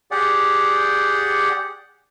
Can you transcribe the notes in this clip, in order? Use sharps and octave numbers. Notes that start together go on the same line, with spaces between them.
G4 G#4 D5 F#5